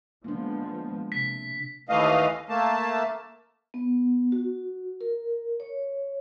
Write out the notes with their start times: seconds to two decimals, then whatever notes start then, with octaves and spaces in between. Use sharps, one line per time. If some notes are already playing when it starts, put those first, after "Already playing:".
0.24 F3 G#3 A#3 B3 D4
1.12 C3 B6
1.89 D#2 E3 A3 D#5 F5
2.49 A3 A#3 A5
3.74 B3
4.32 F#4
5.01 A#4
5.60 C#5